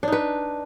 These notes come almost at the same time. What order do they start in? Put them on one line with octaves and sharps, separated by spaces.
D4 D#4 B4